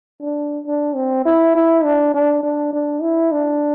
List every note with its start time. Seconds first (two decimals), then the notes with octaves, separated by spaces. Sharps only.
0.21 D4
0.67 D4
0.95 C4
1.25 E4
1.55 E4
1.84 D4
2.14 D4
2.43 D4
2.73 D4
3.02 E4
3.32 D4